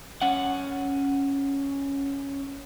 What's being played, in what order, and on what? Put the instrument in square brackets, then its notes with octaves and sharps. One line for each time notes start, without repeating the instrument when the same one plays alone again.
[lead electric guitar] C#4 F#5